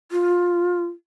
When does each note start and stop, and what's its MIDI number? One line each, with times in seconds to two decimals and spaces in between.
0.12 0.87 65